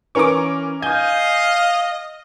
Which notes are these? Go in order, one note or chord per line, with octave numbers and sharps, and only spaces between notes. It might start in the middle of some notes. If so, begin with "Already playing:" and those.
E3 C#4 A#4 C#6 D6
D#5 F5 G#5 D#6 G6